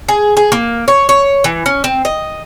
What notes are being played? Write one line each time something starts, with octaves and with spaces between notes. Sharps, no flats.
G#4
G#4
A#3
C#5
C#5
E3
C#4
C4
D#5